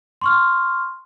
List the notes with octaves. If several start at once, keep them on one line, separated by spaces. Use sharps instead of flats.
C6 C#6 F6